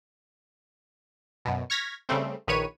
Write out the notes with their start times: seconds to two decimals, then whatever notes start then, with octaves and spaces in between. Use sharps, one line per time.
1.45 F#2 B2
1.70 C#6 F6 G#6 A#6 B6
2.09 C#3 G3 A3 C4
2.48 A#1 D#3 B4 C#5 D#7